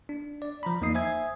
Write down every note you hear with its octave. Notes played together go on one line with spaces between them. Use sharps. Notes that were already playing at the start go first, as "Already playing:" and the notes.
D4
D5
F3 A#5 B5
E2 A#3 D#4 D#5 D#6 C7
C5 E5 G#5 D#6 G#6